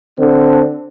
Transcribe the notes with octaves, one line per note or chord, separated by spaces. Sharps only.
D3 C4 D4